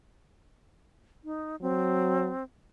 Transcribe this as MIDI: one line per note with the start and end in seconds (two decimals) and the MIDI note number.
1.24 1.56 63
1.61 2.31 54
1.61 2.43 60